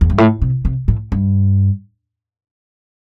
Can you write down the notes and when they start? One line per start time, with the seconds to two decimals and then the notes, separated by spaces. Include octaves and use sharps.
0.01 E2
0.10 G2
0.18 A2
0.42 C3
0.65 C3
0.88 A2
1.12 G2